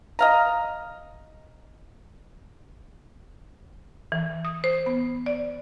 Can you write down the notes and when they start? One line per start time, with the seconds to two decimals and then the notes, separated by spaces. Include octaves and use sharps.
0.19 D#5 F5 A#5
4.12 E3
4.45 D#6
4.64 C5
4.86 B3
5.26 D5